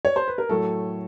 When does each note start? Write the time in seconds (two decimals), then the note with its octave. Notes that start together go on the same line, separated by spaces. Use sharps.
0.05 C#5
0.16 C5
0.28 B4
0.38 A#4
0.49 A2 F#3 A3 A4